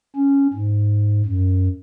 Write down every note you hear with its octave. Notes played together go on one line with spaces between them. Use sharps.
C#4
G#2
F#2